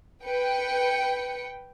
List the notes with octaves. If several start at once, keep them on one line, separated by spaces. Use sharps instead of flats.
B4 G5 C#7